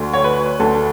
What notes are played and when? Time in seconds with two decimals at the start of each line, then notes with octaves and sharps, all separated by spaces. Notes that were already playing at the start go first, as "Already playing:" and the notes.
Already playing: D2 D3
0.13 C#5
0.24 B4
0.60 D2 D3 A4